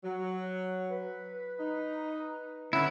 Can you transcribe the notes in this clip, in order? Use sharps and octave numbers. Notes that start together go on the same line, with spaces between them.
F#3
B4
D#4
D3 B3 C#4 E4